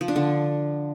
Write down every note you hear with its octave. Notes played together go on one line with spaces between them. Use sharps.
F3
D4
D3